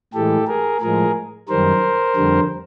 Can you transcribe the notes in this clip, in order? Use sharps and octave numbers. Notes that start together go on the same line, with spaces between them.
A2 E3 G#3 G4 A4
G#4 A#4
A2 F3 G#3 G#4 A#4
F#2 D#3 G3 A#4 C5
F2 D3 G3